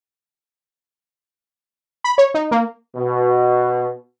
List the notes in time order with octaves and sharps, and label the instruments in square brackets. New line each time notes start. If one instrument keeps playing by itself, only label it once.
[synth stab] B5
C#5
D#4
A#3
[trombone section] B2